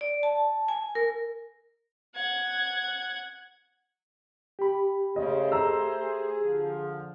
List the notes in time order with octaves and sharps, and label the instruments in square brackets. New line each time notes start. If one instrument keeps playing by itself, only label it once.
[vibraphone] D5
A5
G#5
A#4
[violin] F#5 G#6
[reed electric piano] G4 B5
[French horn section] C#3 [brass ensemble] A3 C5 [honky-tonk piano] D#5
[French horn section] G#4 [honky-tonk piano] A#5 E6
[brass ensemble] D3 F3